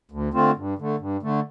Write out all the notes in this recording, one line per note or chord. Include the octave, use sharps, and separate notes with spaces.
D2
D3 A3 C4 F4
G2
D3 A3
G2
D3 A3